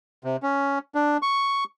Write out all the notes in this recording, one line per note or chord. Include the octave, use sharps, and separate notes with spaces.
C3
C#4
D4
C#6